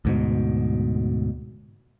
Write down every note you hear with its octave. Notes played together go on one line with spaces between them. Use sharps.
D2 G#2 B2